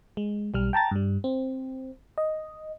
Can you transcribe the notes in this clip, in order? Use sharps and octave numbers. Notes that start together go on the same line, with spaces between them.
G#3
B1 G3 F6
G5 A5 A#5 A6
G2 G3
C4
D#5